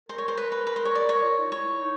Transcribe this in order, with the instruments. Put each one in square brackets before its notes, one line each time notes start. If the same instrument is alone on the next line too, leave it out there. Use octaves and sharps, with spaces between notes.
[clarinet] A#4 [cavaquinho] C5
[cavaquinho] C#5
C5
B4
B4
B4
C5
C#5
D5
C#5
[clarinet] F4
D#4
[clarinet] E4 [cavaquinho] C#5
[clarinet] D#4